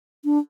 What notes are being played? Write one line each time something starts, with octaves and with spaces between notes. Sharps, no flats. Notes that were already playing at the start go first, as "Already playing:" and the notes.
D4